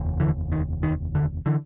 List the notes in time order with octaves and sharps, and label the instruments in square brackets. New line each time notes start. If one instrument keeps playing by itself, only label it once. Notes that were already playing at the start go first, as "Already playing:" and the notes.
Already playing: [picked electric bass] F1 D#2
D3 E3
D#3
D#3
D3
D3 E3